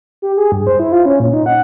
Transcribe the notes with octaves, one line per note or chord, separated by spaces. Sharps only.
G4
G#4
G2
C5
E4
F4
C#4
A#2
D#4
F#5